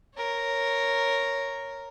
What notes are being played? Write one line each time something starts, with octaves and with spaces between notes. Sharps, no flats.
A#4 C#5